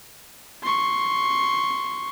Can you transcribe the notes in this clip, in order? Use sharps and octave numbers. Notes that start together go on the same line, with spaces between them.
C6 C#6